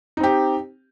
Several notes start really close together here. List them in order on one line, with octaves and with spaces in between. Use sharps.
D#4 C4 G4